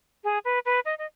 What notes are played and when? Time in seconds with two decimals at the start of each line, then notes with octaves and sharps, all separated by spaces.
0.24 G#4
0.45 B4
0.66 B4
0.85 D#5
0.99 D#5